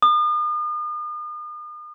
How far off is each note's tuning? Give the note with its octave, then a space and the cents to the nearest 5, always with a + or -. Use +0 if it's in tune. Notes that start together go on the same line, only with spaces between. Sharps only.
D#6 -40